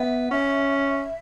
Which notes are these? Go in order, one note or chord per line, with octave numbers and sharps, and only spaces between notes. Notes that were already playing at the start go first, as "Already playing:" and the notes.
Already playing: B3 E5
C#4 E5